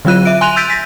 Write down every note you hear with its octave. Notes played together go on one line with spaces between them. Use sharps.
D3 F#3 F4 F#6 D#7
E5 D7
G#5 C6 F#6 D#7 F7
E6 G6 A6 B6 D7 D#7
A#6 B6